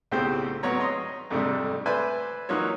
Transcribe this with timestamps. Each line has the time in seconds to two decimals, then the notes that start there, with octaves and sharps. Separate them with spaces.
0.12 B1 A2 C#3 C4 G4 C5
0.63 G#1 F#3 B3 C#5 A#5
0.80 D#5 A#5 C6
1.30 F2 G#2 C3 G3 A3 D4
1.86 B4 C5 D5 E5 G#5 B5
2.49 E3 F#3 A#3 D#4 F4 C#5